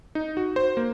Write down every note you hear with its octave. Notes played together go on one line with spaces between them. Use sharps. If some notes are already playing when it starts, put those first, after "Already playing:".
D#4
F#4
C5
A#3